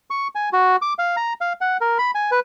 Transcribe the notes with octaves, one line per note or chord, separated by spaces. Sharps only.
C#6
G#5
F#4
D6
F5
A#5
F5
F#5
A#4
B5
G#5
B4